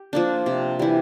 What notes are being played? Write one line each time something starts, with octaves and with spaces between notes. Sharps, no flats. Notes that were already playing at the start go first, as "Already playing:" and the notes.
Already playing: G4
F3 A#3 D4
C3
E3 G3